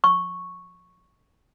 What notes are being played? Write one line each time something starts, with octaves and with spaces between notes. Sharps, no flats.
C#6